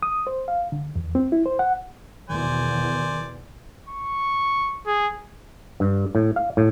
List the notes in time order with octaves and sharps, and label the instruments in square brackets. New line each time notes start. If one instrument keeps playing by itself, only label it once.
[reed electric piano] D#6
C5
F5
D3
E2
C4
E4
C5
F#5
[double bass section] E2 B2 [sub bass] D#3 [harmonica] C5 D5 G#5
[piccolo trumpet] C#6
G#4
[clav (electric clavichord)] G2
A2
F5
A2